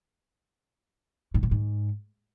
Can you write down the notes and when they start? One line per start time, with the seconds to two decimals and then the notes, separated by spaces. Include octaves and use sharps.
1.34 G#2
1.43 A2
1.51 G#2